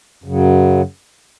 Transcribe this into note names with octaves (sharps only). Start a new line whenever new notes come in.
F#2 C#3 F#3